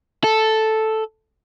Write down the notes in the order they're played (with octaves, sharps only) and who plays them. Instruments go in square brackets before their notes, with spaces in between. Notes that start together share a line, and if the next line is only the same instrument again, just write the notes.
[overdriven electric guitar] A4